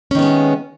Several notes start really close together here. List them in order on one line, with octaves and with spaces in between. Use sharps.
C#4 D#3 B3 G#3 C3